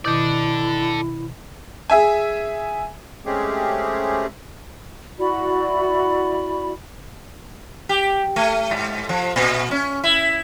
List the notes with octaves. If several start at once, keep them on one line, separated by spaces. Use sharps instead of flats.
B2 D#3 E4 A4 D5 D6
G#4 E5 G#5
G#3 A3 C4 C#4 G4 G#4
E4 F#4 D5 B5
G4
A3
G#2
F3
A#2
C#4
E4